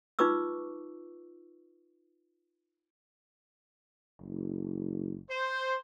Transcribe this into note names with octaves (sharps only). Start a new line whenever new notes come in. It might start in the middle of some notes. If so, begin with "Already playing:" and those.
D#4 F4 B4 C#6 D6 E6
F#1
C5